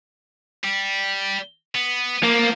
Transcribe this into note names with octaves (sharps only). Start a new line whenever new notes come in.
G3
B3
F3 A#3